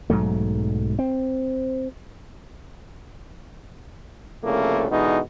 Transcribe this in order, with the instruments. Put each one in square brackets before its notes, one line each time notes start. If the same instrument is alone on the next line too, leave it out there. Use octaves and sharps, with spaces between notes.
[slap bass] B1 G#2 F#3 A3
C4
[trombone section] C2 C#3 F3 A3 A#3
B2 D3 E3 G#3 D#4